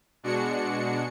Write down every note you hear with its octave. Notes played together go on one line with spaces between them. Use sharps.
B2 G#3 D4 F#4 C#7